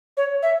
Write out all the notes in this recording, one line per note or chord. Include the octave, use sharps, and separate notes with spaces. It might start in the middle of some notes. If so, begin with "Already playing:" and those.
C#5
E5